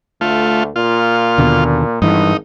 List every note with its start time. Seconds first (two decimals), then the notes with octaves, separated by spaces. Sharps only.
0.21 D2 A3 F4
0.76 A#2 F4
1.38 D#2 B2 D3
2.02 G#1 G2 E3 D#4